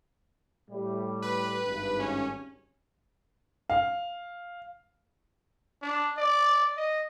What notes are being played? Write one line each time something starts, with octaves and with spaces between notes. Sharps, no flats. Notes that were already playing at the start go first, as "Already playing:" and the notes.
A2 G3
B4
G#1 G2
C#4
F5
D4
D5
D#5